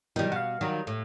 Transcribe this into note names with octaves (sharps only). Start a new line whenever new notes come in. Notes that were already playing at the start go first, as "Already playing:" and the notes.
B2 D#3 E3 F#3 G3
B2 F5 F#5
D#3 F#3 G3
A2